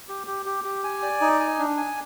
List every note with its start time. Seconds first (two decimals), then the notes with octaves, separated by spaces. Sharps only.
0.08 G4
0.27 G4
0.46 G4
0.64 G4
0.84 G#5
1.02 D5
1.21 D#4
1.40 G#5
1.59 D4
1.77 G#5